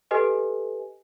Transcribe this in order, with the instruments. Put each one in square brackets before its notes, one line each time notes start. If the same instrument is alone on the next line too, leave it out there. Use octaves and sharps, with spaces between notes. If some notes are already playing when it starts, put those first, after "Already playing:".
[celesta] G4 A4 B4 D#5 G#5